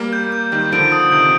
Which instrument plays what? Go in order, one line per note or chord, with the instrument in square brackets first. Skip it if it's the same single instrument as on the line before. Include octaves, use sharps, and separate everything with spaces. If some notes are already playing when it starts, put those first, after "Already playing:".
Already playing: [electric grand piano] G3 A#3
[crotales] G6
G6
[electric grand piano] D#3 G3 [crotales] G6
[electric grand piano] D3 F3 [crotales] D7
[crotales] D#6
[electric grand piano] C3 D#3 [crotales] G6